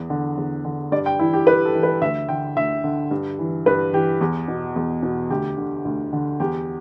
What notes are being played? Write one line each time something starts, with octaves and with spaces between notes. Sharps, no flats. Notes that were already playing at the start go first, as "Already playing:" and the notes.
Already playing: E2
D3
E2
D3
G2 D5
G5
E3 E4
G4
G2 B4
A4
E3
B4
D2 E5
D3 G5
D2 E5
D3
G2
E3
G2 B4
E3 G4
E2
B2
E2
B2
D2 G4
D3
D2
D3
E2 G4